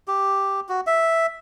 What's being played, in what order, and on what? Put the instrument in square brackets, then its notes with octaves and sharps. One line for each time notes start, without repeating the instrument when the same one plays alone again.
[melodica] G4
F#4
E5